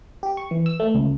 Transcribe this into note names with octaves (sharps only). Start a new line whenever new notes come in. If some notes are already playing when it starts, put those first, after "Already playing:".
G4
C#6
E3
E6
A3
C#2